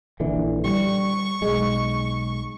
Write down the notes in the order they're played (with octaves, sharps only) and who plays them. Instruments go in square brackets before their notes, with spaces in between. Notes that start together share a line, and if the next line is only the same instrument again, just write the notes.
[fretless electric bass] A#1 D3 E3
[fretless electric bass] G3 [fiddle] C#6
[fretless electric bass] B1 G#3